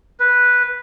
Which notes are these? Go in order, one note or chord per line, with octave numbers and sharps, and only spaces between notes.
B4